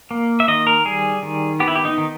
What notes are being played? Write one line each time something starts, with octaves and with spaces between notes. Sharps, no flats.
A#3
E5
D#3 D#5
A#4
G3 G#4
D#3
B3 G4
E4
G4
D#4
D#3